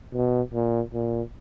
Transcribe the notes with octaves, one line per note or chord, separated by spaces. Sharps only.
B2
A#2
A#2